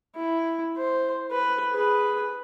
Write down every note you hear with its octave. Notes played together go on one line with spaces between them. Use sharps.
E4
C5
B4
G#4 B4